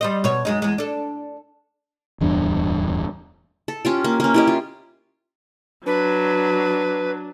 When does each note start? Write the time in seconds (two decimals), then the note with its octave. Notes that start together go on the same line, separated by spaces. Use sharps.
0.01 G3 C5 D#5
0.24 B2 C#5
0.45 F#2 G#3 D#4
0.62 E2 G#3
0.78 D4 A4
2.21 D1 E2 G2 D4
3.68 A4
3.85 C#4 F4 G4
4.04 A#3
4.20 A#3 C#4
4.34 E4 G4 D#5
4.47 F4
5.86 F#3 D4 B4